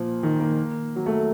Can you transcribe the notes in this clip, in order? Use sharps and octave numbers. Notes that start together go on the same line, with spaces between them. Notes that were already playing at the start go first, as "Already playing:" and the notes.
Already playing: A#2 F3
D#3
A#3
F#3
A3